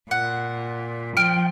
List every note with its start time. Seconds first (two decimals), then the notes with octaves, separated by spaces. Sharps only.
0.11 A#2 F#5
1.17 F3 G5 F6